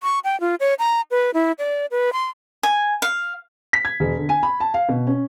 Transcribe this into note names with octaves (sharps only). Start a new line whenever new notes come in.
C#6
G5
F4
C#5
A#5
B4
E4
D5
B4
C6
G#5
F5
B6
G#6
E1
D3
G#5
B5
A5
F5
B2
C#4